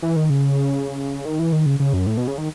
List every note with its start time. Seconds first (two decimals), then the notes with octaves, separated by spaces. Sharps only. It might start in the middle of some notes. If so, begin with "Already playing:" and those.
0.02 E3
0.16 D#3
0.30 C#3
1.25 D#3
1.39 E3
1.52 D#3
1.66 C#3
1.80 C#3
1.93 F#2
2.07 A2
2.17 B2
2.27 C#3
2.38 D#3